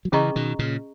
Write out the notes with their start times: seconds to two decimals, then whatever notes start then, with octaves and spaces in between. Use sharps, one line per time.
0.05 F#3
0.12 C#3 E3 C#4 G#4 D#5 A#5 C#6
0.36 B2 D#3
0.59 A#2 C#3